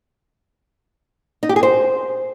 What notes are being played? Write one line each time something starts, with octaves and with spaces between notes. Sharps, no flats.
D#4
G4
G#4
C5